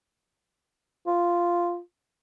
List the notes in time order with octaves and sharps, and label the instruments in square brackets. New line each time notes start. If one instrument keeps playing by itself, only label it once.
[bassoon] F4